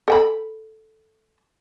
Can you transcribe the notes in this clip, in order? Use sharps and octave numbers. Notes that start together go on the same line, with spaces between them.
A4 G5 B5